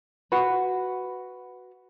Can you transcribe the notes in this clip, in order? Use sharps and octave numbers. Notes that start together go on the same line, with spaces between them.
F#4 B4